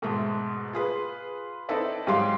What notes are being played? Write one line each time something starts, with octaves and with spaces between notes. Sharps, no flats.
G#2 B2 G#3 A3
F4 G#4 B4
C4 D#4 E4 A4 B4 D5
G#2 F#3 G4 F5 C6